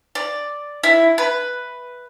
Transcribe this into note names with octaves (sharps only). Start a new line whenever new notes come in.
D5
E4
B4